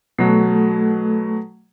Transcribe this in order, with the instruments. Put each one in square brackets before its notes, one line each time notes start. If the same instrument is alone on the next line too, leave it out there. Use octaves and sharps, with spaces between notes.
[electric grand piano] B2 F#3 F#4 [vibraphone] A3 A4